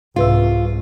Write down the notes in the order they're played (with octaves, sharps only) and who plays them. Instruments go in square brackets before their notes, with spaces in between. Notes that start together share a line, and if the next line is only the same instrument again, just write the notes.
[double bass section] C2 [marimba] G#2 B4 E6 [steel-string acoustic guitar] F4